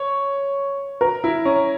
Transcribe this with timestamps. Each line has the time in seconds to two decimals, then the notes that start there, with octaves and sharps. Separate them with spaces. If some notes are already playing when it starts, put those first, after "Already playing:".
Already playing: C#5
1.01 A#4
1.24 E4
1.45 C#4